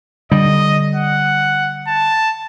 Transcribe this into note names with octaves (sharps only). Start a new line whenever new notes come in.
D3 G3 D#5
F#5
A5